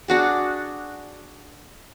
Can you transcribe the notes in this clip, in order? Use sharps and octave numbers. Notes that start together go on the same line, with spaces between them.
D4 F#4 G#4